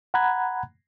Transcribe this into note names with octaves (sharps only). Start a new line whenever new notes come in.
F#5 A#5 B5 F#6 G#6